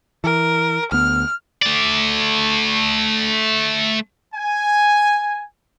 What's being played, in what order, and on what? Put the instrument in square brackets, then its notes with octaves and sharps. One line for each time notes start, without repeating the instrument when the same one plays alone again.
[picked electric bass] E3 [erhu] A#4
[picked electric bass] D2 B3 [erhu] F6
[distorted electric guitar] A3 D5
[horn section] G#5